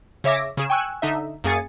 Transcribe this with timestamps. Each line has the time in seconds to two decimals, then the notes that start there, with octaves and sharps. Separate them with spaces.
0.24 C#3 C#5 E5 D6 A#6
0.57 C#3 G#4 E7
0.70 G5 G#5 C#6 E6 F#6
1.02 D3 D#4 E5
1.44 F#2 A#3 G#4 G#5 A6 C#7